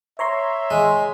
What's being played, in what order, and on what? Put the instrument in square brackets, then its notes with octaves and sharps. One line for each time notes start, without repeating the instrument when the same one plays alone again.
[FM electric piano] C#5 A#5 C6 [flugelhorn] E5
[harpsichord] G#3